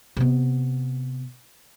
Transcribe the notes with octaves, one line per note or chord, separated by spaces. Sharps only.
C3 B3